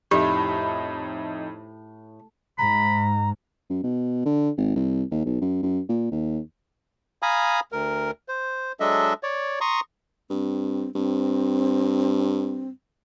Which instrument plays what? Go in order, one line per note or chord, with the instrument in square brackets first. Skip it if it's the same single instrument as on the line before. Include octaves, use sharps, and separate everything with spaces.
[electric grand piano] F2 D#4 E5 [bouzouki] A2 [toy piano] G4
[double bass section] G#2 [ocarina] A#5 [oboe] B5
[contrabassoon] F#2
B2
D3
G#1
C2
D#2
B1
F#2
F#2
A#2
D#2
[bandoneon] F5 G#5 A#5 B5 D#6
D2 A#4
C5
F#3 G#3 D4 A4 D#5 E5
C#5 D5
A#5 C6 C#6 D#6
[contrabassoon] G2 [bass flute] C4
[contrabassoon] G2 [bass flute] C4